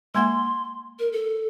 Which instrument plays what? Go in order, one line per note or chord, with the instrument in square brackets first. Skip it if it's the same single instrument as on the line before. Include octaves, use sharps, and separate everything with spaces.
[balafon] G#3 A#3 F#5 [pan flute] C6
[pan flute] A#4
A4